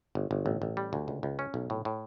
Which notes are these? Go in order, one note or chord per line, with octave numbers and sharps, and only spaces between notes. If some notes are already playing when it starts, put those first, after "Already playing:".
G1
G1
A1
A1
G3
D2
C#2
C#2
C#4
B1
A2
A2